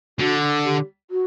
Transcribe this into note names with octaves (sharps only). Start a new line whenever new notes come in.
D3 F#4
G4
F#4